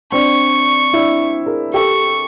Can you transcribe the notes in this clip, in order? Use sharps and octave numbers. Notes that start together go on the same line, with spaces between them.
C4 D4 C#6
D4 E4
G#4 A#4
G4 A4 C#6